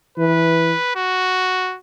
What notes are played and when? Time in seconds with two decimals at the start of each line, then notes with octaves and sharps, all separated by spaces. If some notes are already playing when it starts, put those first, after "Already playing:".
0.18 E3 B4
0.96 F#4